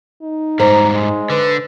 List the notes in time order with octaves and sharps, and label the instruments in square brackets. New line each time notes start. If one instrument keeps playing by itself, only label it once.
[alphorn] D#4
[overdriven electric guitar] G#2 G3 [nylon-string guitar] C5 [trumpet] A#5
[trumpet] G#3
[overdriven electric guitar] D3 [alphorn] B4